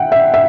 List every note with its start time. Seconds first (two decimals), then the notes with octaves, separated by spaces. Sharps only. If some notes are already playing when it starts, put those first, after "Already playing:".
Already playing: E5 F#5 G5
0.12 E5
0.34 E5